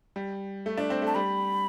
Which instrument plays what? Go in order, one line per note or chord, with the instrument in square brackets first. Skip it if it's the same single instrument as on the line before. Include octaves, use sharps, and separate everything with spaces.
[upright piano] G3
A3
D4
C4
A3
[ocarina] A5
[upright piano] G3 [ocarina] B5